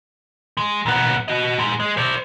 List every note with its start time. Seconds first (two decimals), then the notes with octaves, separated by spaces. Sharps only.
0.57 G#3
0.86 B1 B3
1.28 F#4 D#5
1.58 G#2 G#3
1.80 G#3
1.97 C5 D5